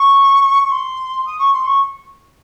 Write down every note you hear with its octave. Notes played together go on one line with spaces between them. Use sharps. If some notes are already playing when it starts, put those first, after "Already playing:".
Already playing: C#6
C#6
C6
D#6
C#6
C6
C#6